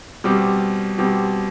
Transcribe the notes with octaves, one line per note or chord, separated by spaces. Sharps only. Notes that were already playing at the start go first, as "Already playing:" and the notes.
B2 G3 C4 G4
B2 G3 C4 G4